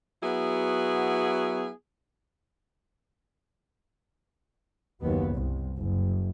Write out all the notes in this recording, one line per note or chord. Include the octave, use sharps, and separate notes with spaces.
F#3 B3 E4 F#4 G#4
F#1 D#2 F#3 B3
C2
F#1